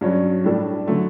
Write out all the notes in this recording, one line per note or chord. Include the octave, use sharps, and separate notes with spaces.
G2 F#3 C#4 F#4
A2 G3 D4 A4
D3 F#3 A3